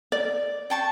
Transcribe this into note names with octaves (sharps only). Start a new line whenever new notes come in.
D5
G5 A5 C#6